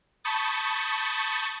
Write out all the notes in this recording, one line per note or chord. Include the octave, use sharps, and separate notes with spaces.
A5 B5 C#6 D#6 G6 A6